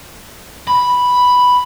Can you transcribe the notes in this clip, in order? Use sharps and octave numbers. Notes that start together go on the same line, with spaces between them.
B5